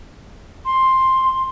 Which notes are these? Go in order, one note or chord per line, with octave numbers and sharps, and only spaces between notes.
C6